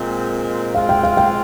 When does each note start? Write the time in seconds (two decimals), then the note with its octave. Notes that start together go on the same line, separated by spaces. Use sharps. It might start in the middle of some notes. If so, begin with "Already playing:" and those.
Already playing: A#2 G#3 C4
0.75 G#3 C4 F4 F5
0.89 G5
1.03 F5
1.17 G5